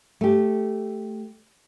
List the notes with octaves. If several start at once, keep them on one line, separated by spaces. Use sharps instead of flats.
A3 G4